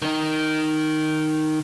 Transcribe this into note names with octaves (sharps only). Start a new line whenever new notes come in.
D#3 D#4